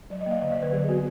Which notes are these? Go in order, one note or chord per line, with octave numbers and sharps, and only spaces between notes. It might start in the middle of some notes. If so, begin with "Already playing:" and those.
F#3 D5
D#5
A#3
F5
D3 D#5
D5
D3
B4
F#3 G#4
B3 F#4